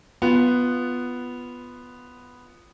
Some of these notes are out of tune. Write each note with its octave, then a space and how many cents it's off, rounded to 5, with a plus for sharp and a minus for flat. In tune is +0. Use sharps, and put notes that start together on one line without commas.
B3 +0 F4 -5